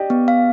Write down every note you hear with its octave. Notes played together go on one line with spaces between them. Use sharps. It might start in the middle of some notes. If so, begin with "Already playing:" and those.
Already playing: G4 D5 D#5
B3
F5